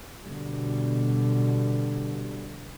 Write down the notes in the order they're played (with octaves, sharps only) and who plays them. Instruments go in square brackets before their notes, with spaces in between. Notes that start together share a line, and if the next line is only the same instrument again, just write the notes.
[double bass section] B2 D3 G3